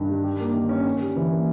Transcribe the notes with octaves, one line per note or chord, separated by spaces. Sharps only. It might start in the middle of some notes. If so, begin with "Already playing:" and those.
Already playing: G2 D#3
G3
G4
A#3
D#3
C#4
C#4
G3
E3
A#3